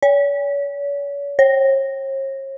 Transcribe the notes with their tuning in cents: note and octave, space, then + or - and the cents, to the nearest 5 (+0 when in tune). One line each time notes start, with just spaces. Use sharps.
C#5 +40
C#5 -40